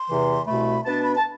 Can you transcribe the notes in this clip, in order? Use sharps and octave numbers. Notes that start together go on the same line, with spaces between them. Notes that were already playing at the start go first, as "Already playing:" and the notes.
Already playing: C6
E2 C3 E3
C2 B2 A3 B5
B2 B3 D4 A5
B5
A5